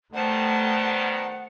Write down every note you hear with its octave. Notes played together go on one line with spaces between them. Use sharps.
D#3 G3 A3 B3 C5 F#5 A5